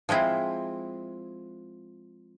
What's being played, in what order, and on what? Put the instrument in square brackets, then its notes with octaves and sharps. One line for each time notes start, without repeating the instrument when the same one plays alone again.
[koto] F3 G#3 C4 E4